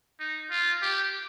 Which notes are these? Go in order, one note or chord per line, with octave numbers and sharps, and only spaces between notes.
D#4
F4
G4